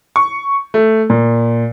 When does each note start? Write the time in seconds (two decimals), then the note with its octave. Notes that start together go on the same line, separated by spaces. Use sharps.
0.16 C#6
0.74 A3
1.10 A#2